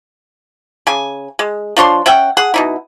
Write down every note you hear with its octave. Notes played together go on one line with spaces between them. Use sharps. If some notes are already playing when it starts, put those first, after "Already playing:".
C#3 G#5
G#3
F3 D4 C#5 C6
C#4 E5 F#5 G5
G#4 F#5
B2 D#4 E4